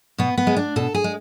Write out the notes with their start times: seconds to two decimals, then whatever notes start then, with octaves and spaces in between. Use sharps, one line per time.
0.18 B2 B3
0.38 B3
0.47 G#3
0.57 D4
0.76 B2 A4
0.94 G#4
1.04 G#3